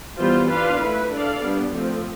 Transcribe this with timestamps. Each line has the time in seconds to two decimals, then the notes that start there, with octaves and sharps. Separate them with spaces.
0.18 E3 G3 B3 F4 C5
0.49 D4 F4 B4 F5
0.81 A3 E4 B4
1.12 D4 A4 D5 F5
1.44 G3 B3 D4
1.75 F3 A3 C4